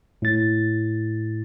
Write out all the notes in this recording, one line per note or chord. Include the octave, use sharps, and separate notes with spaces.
A2 A6